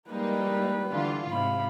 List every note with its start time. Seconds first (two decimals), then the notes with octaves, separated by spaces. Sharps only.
0.10 G3 G#3 A#3 D#4 B4
0.91 D3 E3 F4
1.32 G#2 C3 F5 B5